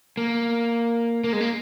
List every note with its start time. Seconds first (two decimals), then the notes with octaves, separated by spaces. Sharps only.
0.17 A#3
1.24 A#3
1.33 G#3
1.41 A#3